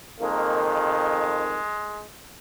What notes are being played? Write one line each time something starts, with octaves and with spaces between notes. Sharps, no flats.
F2 D#3 G#3 A#3
G#3